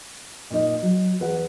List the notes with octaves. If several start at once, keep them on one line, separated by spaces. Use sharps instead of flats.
A#2 D#4
F#3
E2 B4 F#5